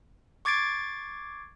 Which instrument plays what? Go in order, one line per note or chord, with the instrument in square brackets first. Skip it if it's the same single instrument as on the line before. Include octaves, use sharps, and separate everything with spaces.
[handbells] C#6 D6 G#6 A6 C7 D7